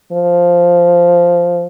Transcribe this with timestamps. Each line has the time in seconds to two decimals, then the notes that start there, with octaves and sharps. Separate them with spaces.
0.12 F3